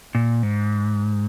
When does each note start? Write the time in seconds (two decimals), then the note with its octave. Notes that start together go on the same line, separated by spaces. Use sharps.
0.15 A#2
0.43 G#2